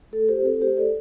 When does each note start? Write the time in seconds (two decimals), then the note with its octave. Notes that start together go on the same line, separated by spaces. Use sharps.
0.12 A3 A4
0.29 G4 C5
0.36 F4
0.42 C4 A4
0.61 A3 G4 C5
0.77 A4 D5